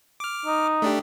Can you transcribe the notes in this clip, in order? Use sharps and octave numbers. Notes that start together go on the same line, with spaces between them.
D6 F6
D#4
A3 D4 G4